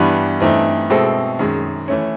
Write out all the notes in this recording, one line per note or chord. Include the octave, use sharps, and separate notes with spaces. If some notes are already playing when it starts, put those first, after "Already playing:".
Already playing: G2 E3 G3 B3
G2 E3 A3 C4 D#4
B2 G#3 C4 E4 A4
F#2 D#3 G#3
E3 A3 C#4